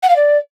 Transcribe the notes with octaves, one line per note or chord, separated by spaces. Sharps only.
F#5
F5
D5